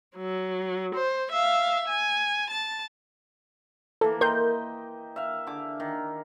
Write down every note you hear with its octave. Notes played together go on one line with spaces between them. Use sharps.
F#3
C5
E5 F5
G#5
A5
E3 A#3 A4
A#4 D#5 G5 C6 G6
E5 F5
D3 G#4 D6
D#3